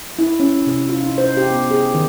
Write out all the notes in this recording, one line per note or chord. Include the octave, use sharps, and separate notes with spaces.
E4
C#4
C3
F4
D#4
C5
G4
B3
G#4
D#3